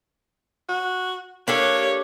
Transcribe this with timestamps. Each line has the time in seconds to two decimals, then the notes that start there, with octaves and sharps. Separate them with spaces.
0.69 F#4
1.48 A#3 D4 G4 A4 C#5